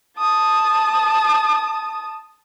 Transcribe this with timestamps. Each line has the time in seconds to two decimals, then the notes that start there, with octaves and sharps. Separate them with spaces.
0.19 A5 D#6